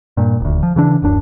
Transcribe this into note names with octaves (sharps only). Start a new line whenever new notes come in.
G2 A#2
D#1 D2
F3
C#3 E3 D4
D1 F#2 D4